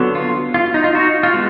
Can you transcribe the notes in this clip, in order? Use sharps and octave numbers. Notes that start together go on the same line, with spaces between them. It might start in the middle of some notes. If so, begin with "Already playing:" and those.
Already playing: D3 F#3 B3
F4
F4
D#4
F4
D#4 F#4
F4
G#3 B3